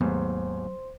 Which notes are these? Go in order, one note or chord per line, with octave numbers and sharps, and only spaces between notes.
D#2 G#2 F#3 A3 B3 C5 C6